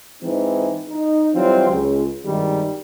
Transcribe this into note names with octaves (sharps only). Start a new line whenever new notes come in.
G#2 E3 C4 D#4
D#4
E3 F#3 G3 C4 F4
C#2
G#1 G2 D#3 G3 D#4